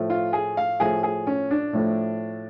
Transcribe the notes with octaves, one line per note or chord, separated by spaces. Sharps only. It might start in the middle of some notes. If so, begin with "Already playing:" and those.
Already playing: A2 F3 A3
F4
G#4
F5
A2 F3 A3 G#4
G#4
C#4
D4
A2 F3 A3